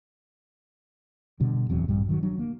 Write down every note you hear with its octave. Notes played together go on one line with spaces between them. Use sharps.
B2 D3 G3
D1 E2 F#3 C4
A#1 G2 G3
D#3 F#3
F#3 D4
A#3